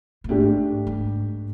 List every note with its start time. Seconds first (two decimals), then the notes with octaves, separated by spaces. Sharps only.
0.24 A2
0.29 G#2 A3 D4 G4
0.87 G#2